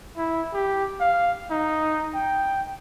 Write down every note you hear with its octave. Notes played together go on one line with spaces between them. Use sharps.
E4
G4
F5
D#4
G5